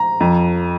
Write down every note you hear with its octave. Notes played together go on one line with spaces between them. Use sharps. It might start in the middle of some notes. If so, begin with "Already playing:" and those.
Already playing: A#5
F2